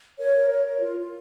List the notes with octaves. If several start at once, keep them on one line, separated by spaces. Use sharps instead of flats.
A#4 C#5
A#4
C#5
A#4
F4
F4